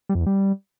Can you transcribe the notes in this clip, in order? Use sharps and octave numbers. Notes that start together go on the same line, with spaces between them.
G3
F2
E2
G3